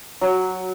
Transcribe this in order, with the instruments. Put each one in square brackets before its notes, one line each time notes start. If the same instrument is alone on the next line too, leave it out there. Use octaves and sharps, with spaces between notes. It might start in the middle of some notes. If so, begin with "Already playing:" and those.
[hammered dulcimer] F#3